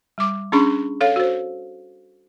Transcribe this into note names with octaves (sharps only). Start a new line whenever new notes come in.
G3 D6
C#4 D4 G#4 B5 C#6
A4 C#5 F5
F#4 C5